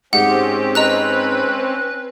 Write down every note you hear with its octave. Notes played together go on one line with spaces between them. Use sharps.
G#2 C4 C#4 G4 F#5
B4 D#5 A#5 F#6